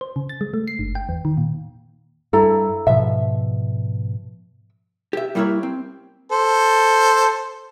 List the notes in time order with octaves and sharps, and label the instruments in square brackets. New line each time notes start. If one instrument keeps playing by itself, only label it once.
[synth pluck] C5
C#3
A6
G#3
A3
C7
G1
G5
E2
D#3
A#2
[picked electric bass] G2 [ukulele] E4 A4 A#5
[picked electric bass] G#2 B2 F3 [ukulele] E5
[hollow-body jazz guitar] G4 E5
G3 A#3 E4 A4 A#4 C#5
C4
[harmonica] A4 C5